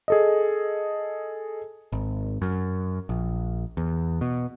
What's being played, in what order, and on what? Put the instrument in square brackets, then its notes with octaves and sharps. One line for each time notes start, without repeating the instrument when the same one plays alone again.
[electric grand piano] G#4 A4 D#5
[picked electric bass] G#1
F#2
A#1
E2
B2